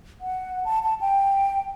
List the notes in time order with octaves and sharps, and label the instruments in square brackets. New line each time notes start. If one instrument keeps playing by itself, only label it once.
[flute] F#5
A5
A5
G5